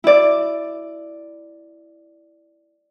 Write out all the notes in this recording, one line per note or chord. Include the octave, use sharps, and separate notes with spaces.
E4 D5